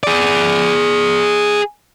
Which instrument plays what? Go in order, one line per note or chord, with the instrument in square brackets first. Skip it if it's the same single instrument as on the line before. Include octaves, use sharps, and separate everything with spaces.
[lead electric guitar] G#4 D5